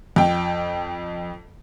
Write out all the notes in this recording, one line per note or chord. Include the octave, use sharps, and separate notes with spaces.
F2 G5